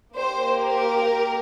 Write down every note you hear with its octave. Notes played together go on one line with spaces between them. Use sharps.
A#3 G4 C5
A#4